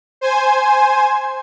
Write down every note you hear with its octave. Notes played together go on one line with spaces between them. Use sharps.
C5 G#5